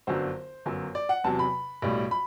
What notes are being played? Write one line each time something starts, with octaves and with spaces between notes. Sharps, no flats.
G1 F#2 D3 F#3 C5
G1 F#2 F#3
D5
F#5
E2 C3 F#3 A5
B5
B1 A2 G3
B5